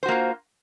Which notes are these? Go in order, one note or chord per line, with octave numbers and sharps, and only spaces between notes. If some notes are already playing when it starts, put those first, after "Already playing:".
A#3 F4 F#4 C5